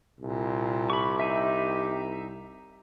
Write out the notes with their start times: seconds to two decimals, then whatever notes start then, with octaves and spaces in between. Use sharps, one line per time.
0.20 C2 A#2
0.90 G4 B5 C#6
1.20 D#4 E5